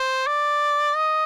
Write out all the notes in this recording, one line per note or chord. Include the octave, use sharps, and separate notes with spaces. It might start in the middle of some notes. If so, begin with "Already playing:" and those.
Already playing: C5
D5
D#5